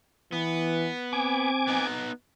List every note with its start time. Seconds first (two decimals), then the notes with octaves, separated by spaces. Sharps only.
0.32 E3 B3
1.13 C4 G#5 D6
1.67 B3 D#4